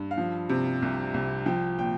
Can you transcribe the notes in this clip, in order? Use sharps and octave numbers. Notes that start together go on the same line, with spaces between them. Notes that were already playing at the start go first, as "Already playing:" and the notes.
Already playing: G2
F5
F3
C3
C2
C2
F3 G5
A#2 G5